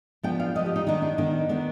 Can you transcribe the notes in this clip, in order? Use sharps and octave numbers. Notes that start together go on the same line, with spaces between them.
F3 B3 D4 G5
F5
F3 B3 D4 D#5
G4
D#4
D#3 B3 D4 D#4
D4
D#3 B3 D4 D#4
D#3 B3 D4